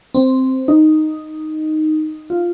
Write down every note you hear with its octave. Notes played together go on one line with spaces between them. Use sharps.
C4
D#4
F4